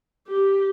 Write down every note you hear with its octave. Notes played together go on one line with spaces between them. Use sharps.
G4